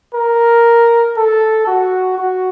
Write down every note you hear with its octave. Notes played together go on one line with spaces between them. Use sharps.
A#4
A4
F#4
F#4